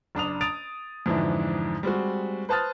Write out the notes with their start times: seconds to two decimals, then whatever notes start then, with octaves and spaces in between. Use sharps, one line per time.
0.15 F#1 D4 D#6 F7
0.41 D#6 A6 D7 F7
1.06 F2 G#2 D3 E3 D4 E4
1.83 G3 G#3 C4 F#4
2.49 B4 C5 A5 D#6 F6 A6